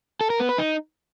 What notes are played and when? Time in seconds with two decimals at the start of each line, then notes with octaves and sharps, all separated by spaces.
0.21 A4
0.30 A#4
0.40 B3
0.49 B4
0.58 D#4